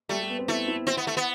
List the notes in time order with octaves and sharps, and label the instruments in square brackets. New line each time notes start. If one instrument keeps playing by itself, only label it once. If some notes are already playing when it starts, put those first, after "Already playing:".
[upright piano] G3 [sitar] A3
[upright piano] G3
B3
C4
[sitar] A3 [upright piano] E4
[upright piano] E4
[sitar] C4 [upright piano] E4
[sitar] B3
A3
B3